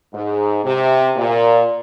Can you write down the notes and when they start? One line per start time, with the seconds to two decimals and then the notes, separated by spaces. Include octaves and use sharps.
0.14 G#2
0.64 C3
1.16 A#2